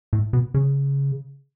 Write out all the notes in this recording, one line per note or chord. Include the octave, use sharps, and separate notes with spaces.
A2
B2
C#3